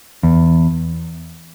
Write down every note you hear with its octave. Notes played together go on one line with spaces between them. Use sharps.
E2